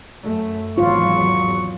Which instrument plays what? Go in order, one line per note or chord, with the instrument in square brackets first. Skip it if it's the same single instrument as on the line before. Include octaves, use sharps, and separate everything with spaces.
[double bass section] F#2 A3
[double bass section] G#1 E2 F#3 [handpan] F4 [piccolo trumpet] C#6